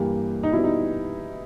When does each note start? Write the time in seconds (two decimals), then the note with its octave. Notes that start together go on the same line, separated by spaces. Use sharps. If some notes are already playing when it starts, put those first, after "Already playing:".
Already playing: G2 E3 A#3 G4
0.43 D#4
0.52 B2 G3 B3 E4
0.64 D#4